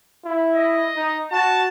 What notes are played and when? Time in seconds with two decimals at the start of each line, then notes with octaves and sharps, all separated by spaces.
0.25 E4
0.56 D#5
0.96 D#4
1.32 F#4 A5